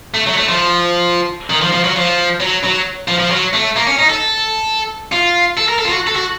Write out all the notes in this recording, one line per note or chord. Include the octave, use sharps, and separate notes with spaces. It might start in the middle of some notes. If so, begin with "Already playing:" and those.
A3
F#3
A3
F3
D#3
F3
F3
F#3
F3
F#3
F#3
F3
F3
F#3
A3
A#3
C#4
D#4
A4
F4
A4
A#4
A4
F4
F#4
A4
F#4